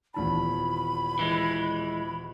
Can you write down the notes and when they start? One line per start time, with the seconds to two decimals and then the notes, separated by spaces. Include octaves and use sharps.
0.14 D#1 E2 A5 B5
1.19 E3 G#3